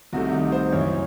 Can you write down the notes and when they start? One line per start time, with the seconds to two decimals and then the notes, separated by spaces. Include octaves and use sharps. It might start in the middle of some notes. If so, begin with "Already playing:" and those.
0.13 C2 C3 D#3 A3 F#4
0.33 D#4
0.52 C5
0.72 F#2 C#3 E3 C#5